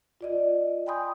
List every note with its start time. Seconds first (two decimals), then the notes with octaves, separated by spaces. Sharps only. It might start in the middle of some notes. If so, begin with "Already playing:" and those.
0.21 F4 D5 D#5
0.86 G5 G#5 B5 C6 D#6 G6